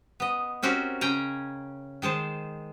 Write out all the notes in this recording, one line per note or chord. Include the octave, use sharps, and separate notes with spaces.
B3 D#5
C4 C#4 F#4 G4 A#4 C5
C#3 C#4 G5 G#5 A#5
D#3 G#3 C5 A5